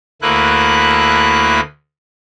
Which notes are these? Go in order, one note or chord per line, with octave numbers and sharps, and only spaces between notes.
D2 A3 A#3 E4 B4 F#6